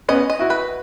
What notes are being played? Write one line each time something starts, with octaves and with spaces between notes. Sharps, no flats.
B3 C#4 D#5
D#5
E4 F#4
B4